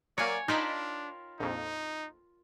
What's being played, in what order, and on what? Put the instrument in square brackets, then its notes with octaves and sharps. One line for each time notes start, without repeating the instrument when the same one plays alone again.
[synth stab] F#3 A#3 [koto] C#5 G#5 [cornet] D5
[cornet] D4 [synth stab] D#4 A5 B5 [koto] F4 A#4 G5
[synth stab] A#1 F2 [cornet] D#4